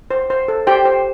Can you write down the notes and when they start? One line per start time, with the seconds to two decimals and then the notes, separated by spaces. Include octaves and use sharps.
0.11 C5
0.30 C5
0.48 A4
0.67 G4 C5 G5
0.85 C5